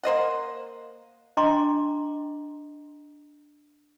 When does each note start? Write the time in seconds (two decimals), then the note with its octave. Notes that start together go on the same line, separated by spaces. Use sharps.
0.03 A#3 C5 D#5 F#5
1.37 D4 D#5 G5 A#5 C6 D6